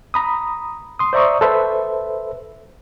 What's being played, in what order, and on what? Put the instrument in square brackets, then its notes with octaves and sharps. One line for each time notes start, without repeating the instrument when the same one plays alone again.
[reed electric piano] A#5 B5 D#6
C6 D#6
C5 D5 E5 A#5 C#6 D#6
A4 B4 C5 E5